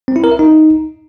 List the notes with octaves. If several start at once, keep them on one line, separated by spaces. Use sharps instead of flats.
C4
E4
A#4
E5
D#4